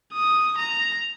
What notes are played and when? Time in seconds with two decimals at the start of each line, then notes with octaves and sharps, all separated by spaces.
0.13 D#6
0.58 A#5